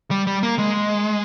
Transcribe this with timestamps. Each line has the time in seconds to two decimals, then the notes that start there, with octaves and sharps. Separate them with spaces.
0.11 G3
0.27 G3
0.43 A#3
0.59 G#3